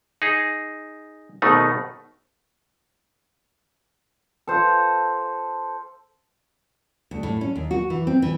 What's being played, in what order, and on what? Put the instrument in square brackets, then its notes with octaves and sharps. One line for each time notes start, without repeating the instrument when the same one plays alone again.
[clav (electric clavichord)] D#4 G#4
G#1 B2 D#3 A3 D#4
[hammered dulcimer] A4 C5 F5 A5
[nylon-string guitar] D2
A2
C#4
D#2
F#4
E3
C4
E3